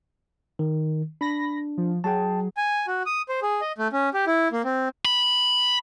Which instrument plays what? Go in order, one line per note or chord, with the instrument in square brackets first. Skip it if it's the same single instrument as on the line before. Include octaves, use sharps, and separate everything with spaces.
[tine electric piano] D#3
[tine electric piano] D4 [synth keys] B5 A#6
[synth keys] F3
[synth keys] F#3 G#4 [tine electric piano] G5 A5
[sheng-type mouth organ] G#5
F#4
D#6
C5
G#4
D#5
A3
C#4
G4
E4
A#3
C4
[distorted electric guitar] B5